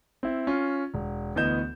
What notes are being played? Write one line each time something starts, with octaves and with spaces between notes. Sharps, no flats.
C4 E4
C#4 F4
E1
D2 E3 B3 D#5 G6 E7